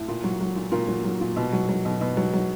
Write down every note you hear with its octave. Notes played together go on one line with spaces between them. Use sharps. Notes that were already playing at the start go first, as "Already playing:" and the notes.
Already playing: A2
A#2
F#3
F#3
A#2
A#2 A#4
F#3
F#3
A#2
B2
F#3
F#3
B2
B2
F#3
F#3